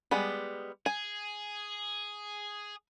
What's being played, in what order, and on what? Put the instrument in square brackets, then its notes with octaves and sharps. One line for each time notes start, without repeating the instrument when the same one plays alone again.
[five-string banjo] G3 G#3 B3
[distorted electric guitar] G#4 [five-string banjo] G#5